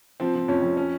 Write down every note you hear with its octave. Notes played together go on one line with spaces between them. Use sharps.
F3 C4
F3
F2 C#4
F2
C#4